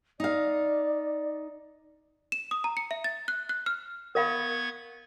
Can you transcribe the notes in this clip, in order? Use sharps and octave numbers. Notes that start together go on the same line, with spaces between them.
D#4 D5 F5
E7
D#6
A#5
C#7
E5
A6
F#6
F#6
F6
B3 A#4 F5 B5 C#6 G#6